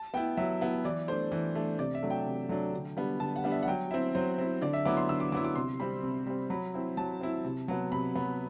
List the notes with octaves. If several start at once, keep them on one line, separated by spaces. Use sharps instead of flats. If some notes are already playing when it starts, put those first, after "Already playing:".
Already playing: A5
B3 E4 G5
F#3 E5
B3 E4
E3 D5
A3 D4 C5
E3
A3 D4
C3 D5
E5
F#3 A3 D4
G5
C3
F#3 A3 D4
D3
G3 B3 D4
D3 A5
F#5
G3 B3 D4
E5
F#5
F#3 G5
C4 E4 E5
F#3 C5
C4 E4
D3 D5
E5
F#3 B3 E4 D6
C6
D3 E6
D6
F#3 B3 E4 D6
D6
C3 C6
G3 C4 B5
C3
G3 C4
F#3 B5
C4 E4
F#3 A5
C4 E4
C3
F#3 B3
C3 B5
F#3 B3